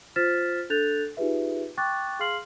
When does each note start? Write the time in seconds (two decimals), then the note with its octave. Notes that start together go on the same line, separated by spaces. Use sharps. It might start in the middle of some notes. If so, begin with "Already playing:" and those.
0.16 F4 C5 F6 A6 B6 E7
0.70 D4 A4 F#6 G6 A6 F7
1.17 D#4 F4 G4 G#4 B4 E5
1.77 G5 C#6 D6 F#6 A6
2.20 G#4 F5 C6 F6 C7 F#7